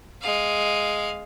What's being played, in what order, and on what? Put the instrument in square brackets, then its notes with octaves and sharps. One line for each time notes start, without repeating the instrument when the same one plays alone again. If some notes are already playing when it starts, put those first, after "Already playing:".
[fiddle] G#3 F5